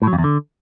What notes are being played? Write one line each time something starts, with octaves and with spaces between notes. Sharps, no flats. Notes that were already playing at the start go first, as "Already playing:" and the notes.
A2
F#3
F2
E2
D3